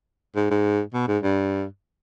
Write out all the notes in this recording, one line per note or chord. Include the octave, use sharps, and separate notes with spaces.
G#2
G#2
B2
G#2
G2